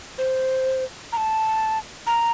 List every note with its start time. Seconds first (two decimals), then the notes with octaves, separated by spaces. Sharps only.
0.18 C5
1.12 A#5
1.17 A5
2.07 A#5